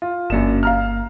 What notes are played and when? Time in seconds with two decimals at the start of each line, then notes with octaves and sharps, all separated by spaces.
0.02 F4
0.30 G1 F#2 A#3 D4 E7
0.63 F5 A#5 F6